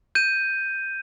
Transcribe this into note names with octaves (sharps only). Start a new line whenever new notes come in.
G6 D#7